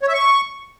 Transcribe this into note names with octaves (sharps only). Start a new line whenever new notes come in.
C#5
E5
C#6